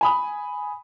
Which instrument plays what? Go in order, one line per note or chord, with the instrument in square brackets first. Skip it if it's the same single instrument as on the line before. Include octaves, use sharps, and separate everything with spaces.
[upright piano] G#5 B5 D#6